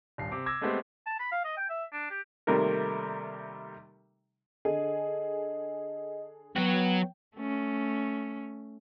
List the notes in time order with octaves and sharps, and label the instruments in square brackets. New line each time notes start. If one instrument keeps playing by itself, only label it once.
[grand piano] D#1 G2 C7
C3 D6
D6 E6 G#6 A#6
G#3 A3 B3 C4 G4
[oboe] A5
B5
F5
D#5
G5
E5
D4
G4
[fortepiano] C3 D#3 G3 A3 A#3 A#4
[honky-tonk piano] D3 G#4 A4 [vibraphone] D#5
[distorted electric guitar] F#3 F#4 [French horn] B3 [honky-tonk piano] G5
[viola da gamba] A3 C#4